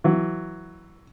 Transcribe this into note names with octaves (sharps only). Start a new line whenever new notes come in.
E3 F#3